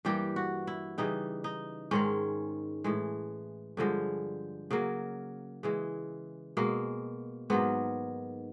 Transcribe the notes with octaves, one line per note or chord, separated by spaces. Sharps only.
G2 E3 G3 A#3 G4
F#4
E4
C#3 E3 G3 D#4
D#4
G#2 D#3 G#3 C#4
A2 E3 G#3
G2 D3 F3 G#3
C#3 F#3 A#3
C#3 E3 G#3
B2 G#3 A#3
G#2 D#3 F#3 A#3 B3